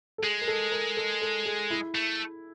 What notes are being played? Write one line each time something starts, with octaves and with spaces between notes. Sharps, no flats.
A4
G#3 G#4
A#4
A4
A#4
A4
A4
G#4
E4
A3